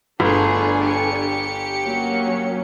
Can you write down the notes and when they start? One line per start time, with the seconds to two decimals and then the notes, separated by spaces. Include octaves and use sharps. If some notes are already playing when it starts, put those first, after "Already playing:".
0.20 G1 A3 D4 G#4 A4 B4 G#5
0.81 G4 C#7
1.86 F#3 A#3 C#4